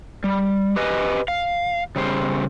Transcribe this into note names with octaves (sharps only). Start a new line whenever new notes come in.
G3
G4 B4 D#5 G#5
F5
C#3 G3 C5